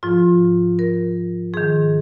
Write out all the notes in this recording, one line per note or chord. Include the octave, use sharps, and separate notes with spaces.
G#2 F3 F4
A#4
G#2 D#3 G#4